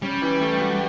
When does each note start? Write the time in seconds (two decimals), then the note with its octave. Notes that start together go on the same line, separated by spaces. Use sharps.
0.02 G3 C#4
0.22 E3
0.41 A3
0.61 F#4